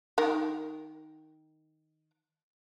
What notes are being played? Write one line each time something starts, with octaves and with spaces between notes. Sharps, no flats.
D#3 A#4